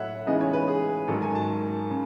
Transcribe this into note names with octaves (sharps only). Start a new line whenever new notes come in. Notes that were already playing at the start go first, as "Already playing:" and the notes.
Already playing: A2 F#3 A3 C#5 E5 F#5
C#3 E3 G#3 B3 D#4 D#5
C#5
B4
G#4
G#2 D#3 F#3 A4
G#5
A5
C#3